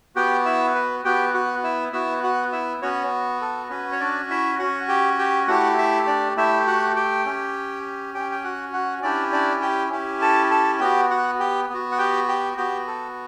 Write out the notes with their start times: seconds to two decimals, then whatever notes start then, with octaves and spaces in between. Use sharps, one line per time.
0.16 B3 F#4 G4 G5
0.45 E4 E5
0.75 B4
1.05 B3 F#4 G4 G5
1.34 F#4 F#5
1.63 E4 E5
1.93 B3 E4 F#4 E5
2.23 F#4 F#5
2.52 E4 E5
2.82 B3 C#4 F#4 C#5
3.41 A4
3.70 C#4 F#4 B4
3.92 C#5
4.00 D4 D5
4.30 E4 E5
4.59 C#4 F#4 F#5
4.89 G4 G5
5.19 G4 G5
5.48 A3 E4 F#4 G4 F#5
5.78 E4 E5
6.07 D4 D5
6.37 A3 E4 G4 E5
6.67 F#4 F#5
6.96 G4 G5
7.26 C#4 G4
8.14 C#4 G4 G5
8.32 G5
8.44 F#4 F#5
8.73 F#4 F#5
9.03 C#4 D4 E4 G4 D5
9.32 D4 D5
9.62 G4 G5
9.92 C#4 E4 G4
10.22 A4 A5
10.51 A4 A5
10.80 B3 F#4 G4 G5
11.10 F#4 F#5
11.40 G4 G5
11.70 B3 F#4
11.92 F#5
11.98 G4 G5
12.28 G4 G5
12.57 B3 F#4 G4 G5
12.87 A4